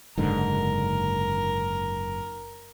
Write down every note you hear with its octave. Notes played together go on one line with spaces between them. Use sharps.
F#1 G#2 D3 A#4